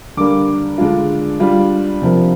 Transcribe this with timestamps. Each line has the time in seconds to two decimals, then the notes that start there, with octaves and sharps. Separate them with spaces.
0.17 D3 G3 A#3 D4 D6
0.78 D3 G#3 D4 F4
1.40 G3 D4 F4
2.02 C3 F3 A#3